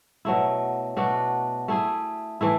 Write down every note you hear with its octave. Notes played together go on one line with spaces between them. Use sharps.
B2 F#3 A3 E4
B2 A3 D4 F#4
A3 E4 G#4
E3 A3 E4